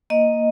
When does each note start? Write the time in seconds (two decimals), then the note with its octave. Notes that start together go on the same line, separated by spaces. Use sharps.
0.10 A#3 D#5